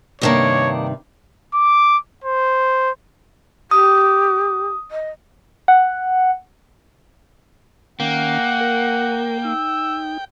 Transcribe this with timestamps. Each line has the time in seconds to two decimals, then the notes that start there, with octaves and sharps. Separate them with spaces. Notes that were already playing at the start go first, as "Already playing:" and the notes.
0.21 G2 C3 D#3 A#3 D4 C#5 D#5
1.54 D6
2.24 C5
3.71 G4 D#6
4.91 D#5
5.68 F#5
8.00 D#3 A#3 C#4 F#5 G5
8.61 A#4
9.45 D#4 E6